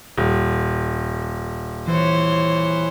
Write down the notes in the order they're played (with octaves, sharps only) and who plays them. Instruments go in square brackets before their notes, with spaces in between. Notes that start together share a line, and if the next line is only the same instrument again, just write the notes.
[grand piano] D#1
[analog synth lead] E3 [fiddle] C5 C#5